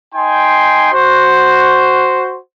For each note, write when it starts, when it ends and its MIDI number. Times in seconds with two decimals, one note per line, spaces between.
0.15 0.92 63
0.15 0.92 79
0.15 0.92 80
0.15 0.92 84
0.93 2.38 66
0.93 2.38 72